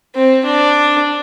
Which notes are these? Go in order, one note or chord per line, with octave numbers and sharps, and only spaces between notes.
C4
D4